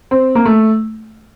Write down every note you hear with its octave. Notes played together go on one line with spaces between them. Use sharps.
C4
A#3
A3